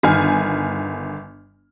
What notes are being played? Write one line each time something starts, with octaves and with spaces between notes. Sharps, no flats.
G1 D#3 G#5 F6